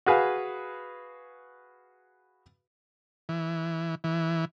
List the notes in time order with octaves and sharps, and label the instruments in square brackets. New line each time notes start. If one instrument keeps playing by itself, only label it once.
[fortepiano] F#4 G#4 B4 F5 G#5
[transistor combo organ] E3
E3